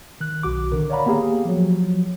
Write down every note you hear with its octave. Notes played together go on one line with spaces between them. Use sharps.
D#3 F#6
B1 F#4 D6
D3 D#3 A#4
C#5 D5 F5 F#5 A#5 B5
A#3 B3 G4 G#4 F5
F3 F#3